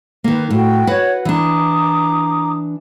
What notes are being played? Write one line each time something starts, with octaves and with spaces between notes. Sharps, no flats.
D#3 A#3 B4
A2 F#4 G5
F#4 B4 C#5 F#5
E3 D4 A#5 D6 D#6